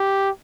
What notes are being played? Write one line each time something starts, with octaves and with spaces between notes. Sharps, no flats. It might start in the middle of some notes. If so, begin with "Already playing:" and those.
Already playing: G4